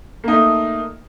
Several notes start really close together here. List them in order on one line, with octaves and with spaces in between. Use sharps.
A#3 D#4 A3